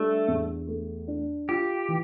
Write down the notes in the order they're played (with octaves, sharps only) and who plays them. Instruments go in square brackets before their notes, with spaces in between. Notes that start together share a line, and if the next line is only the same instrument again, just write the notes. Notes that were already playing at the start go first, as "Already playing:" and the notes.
Already playing: [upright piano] G3 D4 [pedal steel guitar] A3
[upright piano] E2
A3
D4
[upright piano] F4 [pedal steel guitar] G4
[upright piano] E3